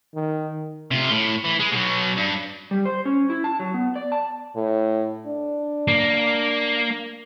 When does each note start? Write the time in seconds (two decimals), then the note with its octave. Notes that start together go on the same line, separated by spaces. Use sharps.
0.14 D#3
0.91 C3 F4
1.10 A2
1.44 E3
1.59 G#3
1.71 B2 F#3
2.17 G2
2.71 G3
2.85 C5
3.05 C#4
3.30 E4
3.44 A5
3.60 F#3
3.74 B3
3.96 D5
4.12 A5
4.56 A2
5.27 D4
5.88 A#3